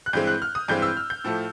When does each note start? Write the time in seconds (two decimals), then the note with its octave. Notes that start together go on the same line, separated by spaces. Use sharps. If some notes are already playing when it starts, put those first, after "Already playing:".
0.06 F#6
0.13 G2 E3 G#3 C4 G6
0.27 F#6
0.42 F6
0.55 D#6
0.68 G2 E3 G#3 C4 G6
0.82 E6
0.97 F6
1.10 G6
1.24 A2 F3 A3